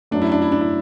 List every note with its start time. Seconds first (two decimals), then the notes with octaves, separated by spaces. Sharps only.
0.11 F#2 F#3 A3 D4
0.22 E4
0.32 D4
0.42 E4
0.52 D4
0.61 E4